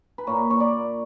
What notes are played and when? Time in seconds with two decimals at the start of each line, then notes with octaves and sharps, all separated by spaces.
0.18 B4
0.27 A#2 A#3 C#5
0.50 C#5
0.60 D5